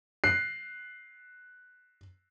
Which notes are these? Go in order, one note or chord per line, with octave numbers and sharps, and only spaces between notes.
F#6 C7